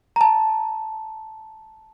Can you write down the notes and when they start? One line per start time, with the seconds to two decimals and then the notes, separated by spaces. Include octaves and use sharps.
0.16 A#5
0.21 A5